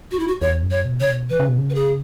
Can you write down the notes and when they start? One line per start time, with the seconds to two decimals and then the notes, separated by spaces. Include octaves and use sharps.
0.11 F#4
0.19 E4
0.28 F#4
0.41 E2 C#5
0.63 F#2
0.71 C#5
0.85 B2
1.01 C#3 C#5
1.08 B2
1.30 E3 B4
1.40 C#3
1.49 B2
1.58 C#3
1.70 B4
1.75 G#4